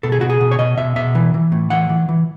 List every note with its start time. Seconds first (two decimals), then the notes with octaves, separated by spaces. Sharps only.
0.03 B2 A4
0.12 G#4
0.21 B2 F#4
0.30 G#4
0.41 B2
0.51 C#5
0.59 B2 D#5
0.78 B2 E5
0.96 B2 E5
1.15 E3
1.34 E3
1.52 A2
1.70 E3 F#5
1.90 E3
2.09 E3